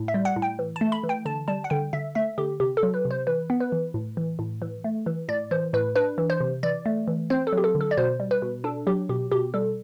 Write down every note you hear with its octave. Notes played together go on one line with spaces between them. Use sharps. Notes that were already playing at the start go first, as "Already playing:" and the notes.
Already playing: A2
E5
G3
F#5
A2
G5
E3
A5
A3
B5
E3
G5
D3 A5
G3 A5
F#5
D3 G5
D3 E5
A3 E5
D3 G4
C3 G4
A4
F#3
B4
C3
C5
E3 B4
B3
B4
E3
A2
E3
A2
E3
A3
E3
A2 D5
E3 C5
A2 B4
D4 B4
E3
C5
C3
E3 D5
A3
E3
C4 C5
A4
F#3
G4
A4
D3
A4
D5
B2 C5
G3
B4
B2
D4 A4
F#3 G4
B2 G4
B2 G4
G3 A4